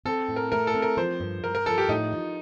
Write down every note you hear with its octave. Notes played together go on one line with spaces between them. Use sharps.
C4 A4
A2
A#4
A3 A#4
A4
C4
A#4
F3 C5
G2
G2 A#4
A#4
F3 A4
G4
A2 D#4
F3